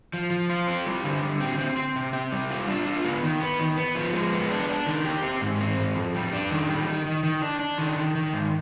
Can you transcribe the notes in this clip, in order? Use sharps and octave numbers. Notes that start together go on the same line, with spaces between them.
F3
F3
F4
C4
G3
D3
D3
C4
C4
C4
C3
C4
G3
F4
D4
F4
B3
D#3
B3
D#3
B3
F3
G#3
B3
D4
D4
D#3
G4
C4
G#2
C4
G#2
F2
G3
D4
D#3
G3
D#3
D#3
D#3
D4
D4
D#3
D#3
D#3
G#2